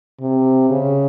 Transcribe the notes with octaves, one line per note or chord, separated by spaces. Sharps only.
C3
C#3